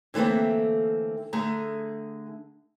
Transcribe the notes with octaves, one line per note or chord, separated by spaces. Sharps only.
D3 E3 A3 A#3 C4
D3 A3 G#4 A#5